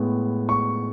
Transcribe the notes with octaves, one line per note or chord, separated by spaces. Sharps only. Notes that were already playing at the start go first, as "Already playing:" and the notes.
Already playing: A2 G#3 B3
C#6